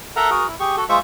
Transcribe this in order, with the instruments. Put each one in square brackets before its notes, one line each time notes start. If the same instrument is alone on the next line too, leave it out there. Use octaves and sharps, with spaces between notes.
[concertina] A4 A#4 E5 F#5 A#5
F#4 G#4 A#4
E4
G4 G#4 C#6
F#4 A4
G#3 F4 C5 E5 C#6